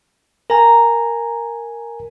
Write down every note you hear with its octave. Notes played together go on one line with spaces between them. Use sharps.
A#4 G#5 A#5